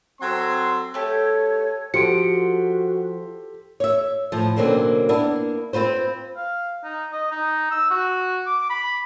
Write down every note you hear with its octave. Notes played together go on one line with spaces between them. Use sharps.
F#3 C4 A4 C6
A3 G4 A4 C#5
F3 F#4 G4 A4 C6 C#7 D7
C#5 E5
A2 F3
B2 D3 F#3 A#3 C4 C#4
A#3 B3 D4 E4
C4 F4 B4 C5
F5
D#4
D#5
D#4
E6
F#4
D6
B5